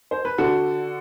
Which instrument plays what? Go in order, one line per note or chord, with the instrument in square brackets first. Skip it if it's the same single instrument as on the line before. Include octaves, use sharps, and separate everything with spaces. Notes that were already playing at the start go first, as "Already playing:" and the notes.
[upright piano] C5
B4
D3 F#4 A4